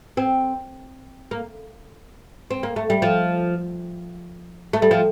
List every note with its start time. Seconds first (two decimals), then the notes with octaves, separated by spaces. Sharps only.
0.17 C4
1.31 A#3
2.51 C4
2.63 A#3
2.76 A3
2.90 G3
3.02 F3
4.73 A3
4.82 G3
4.91 F3